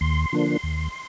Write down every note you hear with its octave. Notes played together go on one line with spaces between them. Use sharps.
D#2 C6
D3 F3 A#3 D4
D#2